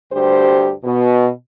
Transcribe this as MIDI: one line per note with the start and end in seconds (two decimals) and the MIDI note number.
0.13 0.72 38
0.13 0.72 43
0.13 0.72 67
0.13 0.72 72
0.84 1.29 47